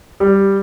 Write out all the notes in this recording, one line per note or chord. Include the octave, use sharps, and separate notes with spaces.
G3